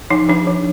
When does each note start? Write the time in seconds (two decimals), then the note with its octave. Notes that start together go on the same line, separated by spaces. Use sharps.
0.10 F3 D#4
0.29 F3 D4
0.47 F3